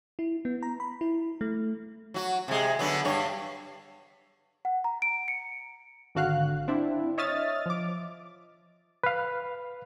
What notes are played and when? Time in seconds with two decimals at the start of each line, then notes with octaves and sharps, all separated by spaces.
0.19 E4
0.45 B3
0.63 A#5
0.80 B5
1.01 E4
1.41 A3
2.14 F#3 F#4
2.48 C3 G#3
2.79 D3 F#3 B3
3.05 G2 C#5
4.65 F#5
4.84 A#5
5.02 D7
5.28 C#7
6.15 G#1 D3 F#4 F5 F#6
6.68 C4 D4 E4
7.18 C#5 D#5 E5 D#6 F6 A6
7.66 F3 D6
9.04 B4 F5